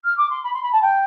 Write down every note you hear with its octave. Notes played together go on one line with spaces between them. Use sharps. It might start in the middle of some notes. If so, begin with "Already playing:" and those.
F6
D6
C6
B5
C6
B5
A5
G5